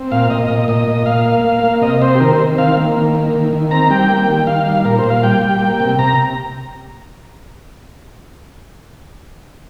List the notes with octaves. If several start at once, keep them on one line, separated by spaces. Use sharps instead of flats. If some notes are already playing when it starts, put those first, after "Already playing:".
Already playing: C4
A#2 F5
A#2 D#5
A#2
A#2 D#5
A#2
A#2 F5
A#3
A#3
A#3
C3 D#5
C4 C5
G4
D#3 A#4
C5
C4
D#3 F5
A#3
D#3
A#3
D#3
D#3
C4 A#5
G3 G5
A#3
D#3
D#3 F5
G3
A#2 A#4
C5
A#2
F5
G3 G5
G3
A#3
C3
C3 A#5